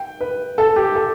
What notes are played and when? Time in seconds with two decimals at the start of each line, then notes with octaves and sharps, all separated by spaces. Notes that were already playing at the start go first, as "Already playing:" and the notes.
Already playing: G5
0.20 B4
0.58 A4
0.76 G4
0.95 A4